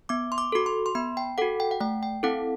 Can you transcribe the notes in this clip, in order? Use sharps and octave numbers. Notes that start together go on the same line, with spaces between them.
B3 D6
C6
D6
F#4 A4 D6
C6
C6
B3 B5
G5
F#4 A4 F#5
G5
F#5
A3 G5
G5
C4 E4 A4 F#5